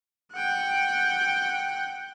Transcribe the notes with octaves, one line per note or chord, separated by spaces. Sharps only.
F#5 G5